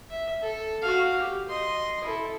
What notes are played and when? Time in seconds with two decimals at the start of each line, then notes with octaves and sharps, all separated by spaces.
0.11 E5
0.42 A4
0.82 F#4 F5
1.20 G4
1.49 D#5 C6
2.04 E4 A4